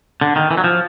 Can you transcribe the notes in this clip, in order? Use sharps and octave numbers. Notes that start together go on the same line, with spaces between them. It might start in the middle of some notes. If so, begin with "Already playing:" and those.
D3
D#3
E3
F#3
F3